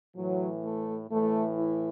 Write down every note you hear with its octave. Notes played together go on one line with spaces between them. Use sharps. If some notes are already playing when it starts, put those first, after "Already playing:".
A2 E3 F#3
A3
A2 E3 A3
E4